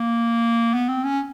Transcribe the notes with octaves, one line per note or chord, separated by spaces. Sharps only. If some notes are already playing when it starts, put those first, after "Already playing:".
Already playing: A#3
B3
C4
C#4